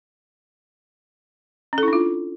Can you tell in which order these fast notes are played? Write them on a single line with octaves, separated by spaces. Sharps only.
C#4 A4 E4 D4 F4